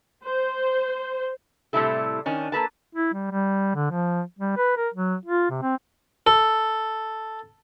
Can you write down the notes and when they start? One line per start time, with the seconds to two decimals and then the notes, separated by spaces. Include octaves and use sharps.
0.25 C5
1.73 A2 C3 G3 A3 E4 A4
2.26 D#3 C#4 D4
2.52 A#3 A4 B4 A5
2.95 E4
3.14 G3
3.31 G3
3.75 D3
3.91 F3
4.39 G3
4.57 B4
4.77 A#4
4.94 F#3
5.26 F4
5.50 C3
5.62 C4
6.27 A4